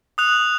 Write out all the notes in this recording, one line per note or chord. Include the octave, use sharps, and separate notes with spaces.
D#6 F#6 F7